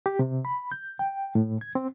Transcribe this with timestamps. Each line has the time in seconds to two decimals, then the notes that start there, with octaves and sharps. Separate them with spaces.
0.06 G4
0.19 C3
0.45 B5
0.72 G6
0.99 G5
1.35 A2
1.61 G#6
1.75 C4